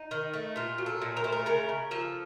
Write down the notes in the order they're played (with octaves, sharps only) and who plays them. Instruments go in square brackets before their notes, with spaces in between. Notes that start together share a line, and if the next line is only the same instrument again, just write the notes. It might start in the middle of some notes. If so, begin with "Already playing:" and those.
Already playing: [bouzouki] D#4
D#3
A3
A#2 F4
F#3
A4
A#2
A#4
A3 C5
A#4
C#3 A#4
C#3
F3 A4